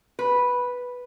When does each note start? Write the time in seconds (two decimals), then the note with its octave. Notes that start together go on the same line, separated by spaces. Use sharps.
0.19 B4